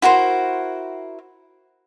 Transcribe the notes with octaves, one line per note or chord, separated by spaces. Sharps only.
E4 F#4 A#4 C5